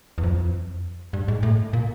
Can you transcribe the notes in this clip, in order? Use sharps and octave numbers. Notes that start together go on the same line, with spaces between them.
E2
F2
G2
G#2
A2
A#2